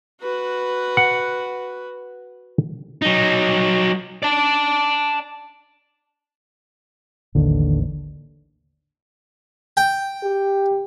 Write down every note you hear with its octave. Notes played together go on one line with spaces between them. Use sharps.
F#4 B4
F#5
F#3 D#4
D5 A5
A1 D#2 D3
G5
G4